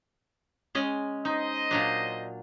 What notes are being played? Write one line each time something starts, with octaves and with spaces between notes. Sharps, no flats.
G#3 C#4 D#5
D#4 C5 D#5
A#2 F#3 D4